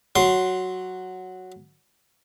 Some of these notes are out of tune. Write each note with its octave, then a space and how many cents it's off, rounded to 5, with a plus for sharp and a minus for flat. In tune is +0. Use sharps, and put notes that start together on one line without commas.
F#3 +0 C6 +0